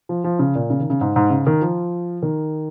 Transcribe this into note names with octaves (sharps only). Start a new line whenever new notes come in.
F3
F3
C#3
A#2
C#3
D#3
C#3
G#2
G#2
C#3
D#3
F3
D#3